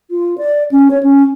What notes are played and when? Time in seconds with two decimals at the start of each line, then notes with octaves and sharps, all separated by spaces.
0.10 F4
0.38 D5
0.71 C#4
0.90 C#5
1.03 C#4